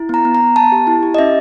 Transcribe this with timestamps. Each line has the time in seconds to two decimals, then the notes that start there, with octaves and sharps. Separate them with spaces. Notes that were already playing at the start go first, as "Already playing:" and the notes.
Already playing: E4
0.09 B3 A#5
0.25 B3
0.35 A#5
0.40 B3
0.56 B3 A5
0.72 G4
0.87 E4
1.03 G4
1.14 D#5
1.19 C#4 E5